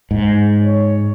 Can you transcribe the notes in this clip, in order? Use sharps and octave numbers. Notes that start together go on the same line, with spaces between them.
G#2
C#5